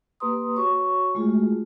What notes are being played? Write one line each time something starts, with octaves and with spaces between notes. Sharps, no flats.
A#3 G4 B4 A#5 C6 D#6
F#4 C#5 C#6
G#3 A3 F4 F#4 G#4